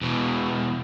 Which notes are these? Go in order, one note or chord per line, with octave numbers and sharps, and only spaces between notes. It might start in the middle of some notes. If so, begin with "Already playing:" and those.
E2 B2